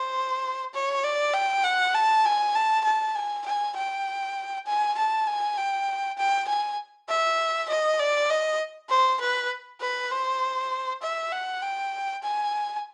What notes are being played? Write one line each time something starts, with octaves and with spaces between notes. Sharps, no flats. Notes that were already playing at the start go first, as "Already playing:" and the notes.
Already playing: C5
C#5
D5
G5
F#5
A5
G#5
A5
A5
G#5
G#5
G5
G#5
A5
G#5
G5
G5
G#5
E5
D#5
D5
D#5
C5
B4
B4
C5
E5
F#5
G5
G#5